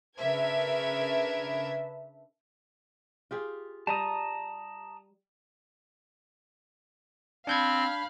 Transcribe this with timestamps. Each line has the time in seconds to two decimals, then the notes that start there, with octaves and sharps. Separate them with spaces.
0.19 C#3 D4 A#4 B4 E5 G#6
3.31 F4 G4 G#4
3.87 G3 A5 A#5 D#6
7.47 C4 D4 F5 B5 G6 G#6